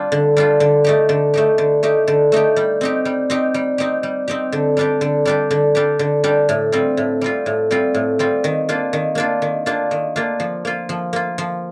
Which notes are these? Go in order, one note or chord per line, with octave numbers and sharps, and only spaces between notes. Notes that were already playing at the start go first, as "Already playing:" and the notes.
Already playing: G3 D4 F4
D3
G3 D4 F4
D3
A3 D#4 G4
D3
A3 D#4 G4
D3
A3 D#4 G4
D3
A3 D#4 G4
G3
C4 D#4 G4
G3
C4 D#4 G4
G3
C4 D#4 G4
G3
C4 D#4 G4
D3
G3 D4 G4
D3
G3 D4 G4
D3
G3 D4 G4
D3
G3 D4 G4
A2
G3 C4 F4
A2
G3 C4 F4
A2
G3 C4 F4
A2
G3 C4 F4
D#3
A#3 D4 F4
D#3
A#3 D4 F4
D#3
A#3 D4 F4
D#3
A#3 D4 F4
F3
A#3 F4
F3
A#3 F4
F3